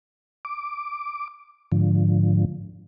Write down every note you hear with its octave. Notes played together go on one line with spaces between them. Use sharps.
D6
G#2 D3 F3